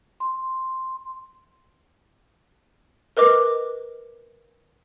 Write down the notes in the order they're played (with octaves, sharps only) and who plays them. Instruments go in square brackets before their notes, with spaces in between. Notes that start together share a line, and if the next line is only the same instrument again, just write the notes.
[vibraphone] C6
[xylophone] A#4 B4 D#5 D6